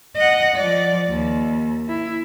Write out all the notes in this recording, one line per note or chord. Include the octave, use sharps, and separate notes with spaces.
D#5 F#5
F3 D5
D#2
E4